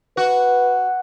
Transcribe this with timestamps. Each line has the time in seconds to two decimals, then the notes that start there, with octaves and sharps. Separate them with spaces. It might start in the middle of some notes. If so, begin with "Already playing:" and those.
0.17 F#4 B4